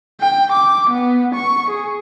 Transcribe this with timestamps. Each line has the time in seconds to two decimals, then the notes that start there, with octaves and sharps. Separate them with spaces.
0.21 G5
0.52 D6
0.90 B3
1.35 C#6
1.70 G#4